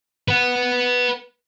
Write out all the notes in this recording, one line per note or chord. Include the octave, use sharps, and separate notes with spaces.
B4 F#5